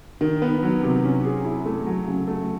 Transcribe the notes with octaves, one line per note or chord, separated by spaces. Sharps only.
D#3
B3
F#3
C3
C#4
G#4
E4
A3
F#3
C#3
A3